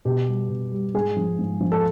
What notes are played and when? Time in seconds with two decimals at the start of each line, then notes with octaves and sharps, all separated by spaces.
0.05 B2 G4
0.28 G3
0.49 B2
0.72 G3
0.94 G#2 G#4
1.16 F3
1.39 G#2
1.61 F3
1.72 A4